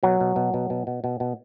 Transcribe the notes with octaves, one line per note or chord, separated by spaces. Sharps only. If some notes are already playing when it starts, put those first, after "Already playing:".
B2 F#3
B2
B2
B2
B2
B2
B2
B2